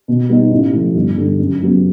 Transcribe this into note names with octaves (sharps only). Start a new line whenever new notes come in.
B2
G3 B3 D#4
A1
A2 F3
G1
G2 D3 G3
F#2
C#3 F#3 B3